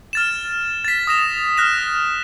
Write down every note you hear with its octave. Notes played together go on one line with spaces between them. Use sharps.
F6 A6 E7
A6 B6
D#6 A#6 E7
F6 F#6 A#6 E7